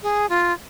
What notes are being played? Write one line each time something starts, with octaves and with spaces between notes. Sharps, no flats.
G#4
F4